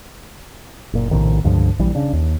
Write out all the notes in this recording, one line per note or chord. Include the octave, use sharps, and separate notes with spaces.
F#1 A#2
A#1 A2 C3 D#3
C#2 G2 D3 F3
A#1 E3 G3
C#3 D4
D#2